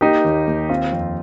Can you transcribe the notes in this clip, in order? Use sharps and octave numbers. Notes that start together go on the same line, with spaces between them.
A#3 D#4 G4
D#2
D#2
C4 F4
F2